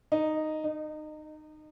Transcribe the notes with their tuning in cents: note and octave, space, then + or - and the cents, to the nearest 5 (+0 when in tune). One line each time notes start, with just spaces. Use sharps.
D#4 -5
D#4 -25